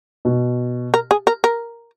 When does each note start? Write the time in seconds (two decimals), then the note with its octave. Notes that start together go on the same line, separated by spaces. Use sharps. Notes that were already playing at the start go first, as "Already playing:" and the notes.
0.25 B2
0.94 A#4
1.11 G#4
1.27 A#4
1.44 A#4